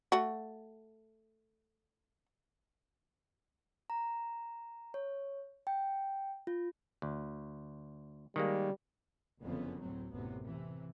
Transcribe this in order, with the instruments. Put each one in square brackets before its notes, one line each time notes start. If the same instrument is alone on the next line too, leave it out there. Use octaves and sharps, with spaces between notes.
[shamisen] A3 F#4
[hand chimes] A#5
C#5
G5
F4
[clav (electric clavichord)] D2
[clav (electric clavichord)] D#3 G#3 A#3 [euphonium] G3
[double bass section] F#1 F2 D3 B3 C#4
D2 A2 F#3 C4
A1 F#2 A2 C3 B3
C3 E3